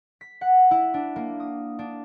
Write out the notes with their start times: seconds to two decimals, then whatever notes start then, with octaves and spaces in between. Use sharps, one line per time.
0.21 B6
0.41 F#5
0.71 E4
0.94 D4
1.16 A#3
1.40 D#6
1.79 D4